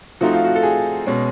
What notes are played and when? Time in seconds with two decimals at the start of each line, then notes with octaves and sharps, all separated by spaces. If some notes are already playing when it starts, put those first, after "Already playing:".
0.21 F3 A3 C4 D#4 F#4
0.33 F4
0.44 F#4
0.55 A4
0.63 G#4
1.07 B2 G#3 C#4